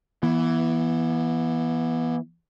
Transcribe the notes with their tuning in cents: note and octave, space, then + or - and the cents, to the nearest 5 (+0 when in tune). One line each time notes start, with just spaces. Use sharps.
E3 +0 B3 -30